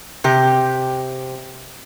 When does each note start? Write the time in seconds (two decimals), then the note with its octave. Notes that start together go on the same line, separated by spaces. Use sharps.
0.24 C3 G4